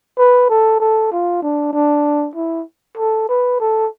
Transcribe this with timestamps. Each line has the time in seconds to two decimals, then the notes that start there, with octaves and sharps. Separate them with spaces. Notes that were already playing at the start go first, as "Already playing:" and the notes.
0.18 B4
0.50 A4
0.80 A4
1.12 F4
1.42 D4
1.73 D4
2.35 E4
2.97 A4
3.29 B4
3.60 A4